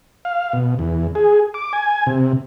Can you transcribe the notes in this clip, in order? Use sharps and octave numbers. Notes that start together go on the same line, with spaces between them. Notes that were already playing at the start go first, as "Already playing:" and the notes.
F5
B2
E2
G#4
D6
G#5
C3